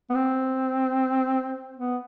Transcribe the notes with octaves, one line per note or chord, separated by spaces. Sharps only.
B3
C4
B3